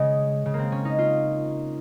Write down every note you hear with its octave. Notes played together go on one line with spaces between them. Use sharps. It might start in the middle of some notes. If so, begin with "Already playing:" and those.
Already playing: C#3 G#3
C#3
A#3 C4
C#4
D#4
F4